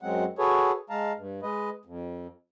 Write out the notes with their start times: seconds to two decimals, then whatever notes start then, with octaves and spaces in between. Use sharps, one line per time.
0.02 F#2 F#3 G#3 C4 F#5
0.39 F#4 G#4 A4 B4 C#5
0.90 G#3 F5 A5 A#5
1.16 G2
1.42 G#3 B4 D#5
1.85 F2